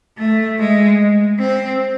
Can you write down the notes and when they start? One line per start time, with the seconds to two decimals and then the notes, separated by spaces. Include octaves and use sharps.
0.18 A3
0.59 G#3
1.39 C4